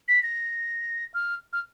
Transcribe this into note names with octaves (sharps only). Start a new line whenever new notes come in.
B6
A#6
F6
F6